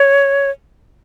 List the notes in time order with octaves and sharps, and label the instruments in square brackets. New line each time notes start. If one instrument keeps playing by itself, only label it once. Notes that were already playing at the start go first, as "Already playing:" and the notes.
Already playing: [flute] C#5